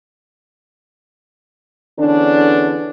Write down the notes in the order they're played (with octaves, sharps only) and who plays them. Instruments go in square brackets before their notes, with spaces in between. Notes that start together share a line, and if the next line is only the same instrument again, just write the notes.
[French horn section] E2 D3 C#4 D4